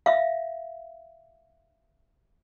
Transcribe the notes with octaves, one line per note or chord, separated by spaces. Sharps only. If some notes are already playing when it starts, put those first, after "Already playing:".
E5 F5